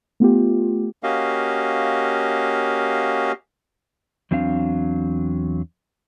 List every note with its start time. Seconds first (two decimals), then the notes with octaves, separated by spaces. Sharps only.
0.20 A3 B3 F4 G4
1.03 A#3 C#4 F#4 G4 D#5 F5
4.31 E2 F#3 C4 D4 F5